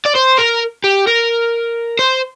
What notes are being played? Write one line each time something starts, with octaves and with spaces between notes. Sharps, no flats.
D5
C5
A#4
G4
A#4
C5